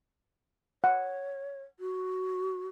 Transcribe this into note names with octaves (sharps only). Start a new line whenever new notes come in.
C#5 F#5
F#4